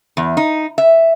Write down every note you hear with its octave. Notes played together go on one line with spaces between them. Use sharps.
E2
D#4
E5